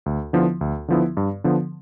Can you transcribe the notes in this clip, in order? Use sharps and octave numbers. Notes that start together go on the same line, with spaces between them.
D2
D3 F3 B3 E4
D2
D3 F3 B3 E4
G2
D3 F3 B3